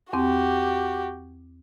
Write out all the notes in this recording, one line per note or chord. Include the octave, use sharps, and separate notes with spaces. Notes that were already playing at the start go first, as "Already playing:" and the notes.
E2 C4 F#4 G4 D6